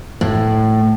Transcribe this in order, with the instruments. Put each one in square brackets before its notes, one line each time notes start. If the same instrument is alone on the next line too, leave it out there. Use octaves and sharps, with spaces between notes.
[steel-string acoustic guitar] A2